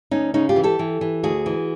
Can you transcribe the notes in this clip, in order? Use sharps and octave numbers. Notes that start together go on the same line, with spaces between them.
D2 C#4 D#4
C#3 C#4 D#4
F4 G4
E3
G4 A4
E3
E3
D2 F#4 G#4
E3